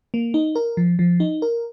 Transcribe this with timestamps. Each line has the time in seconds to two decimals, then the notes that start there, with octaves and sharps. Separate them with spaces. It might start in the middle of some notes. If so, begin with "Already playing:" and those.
0.14 A#3
0.34 D#4
0.55 A#4
0.77 F3
0.99 F3
1.20 D#4
1.42 A#4